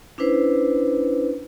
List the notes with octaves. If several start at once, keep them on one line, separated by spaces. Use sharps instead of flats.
C#4 D4 E4 B4 C5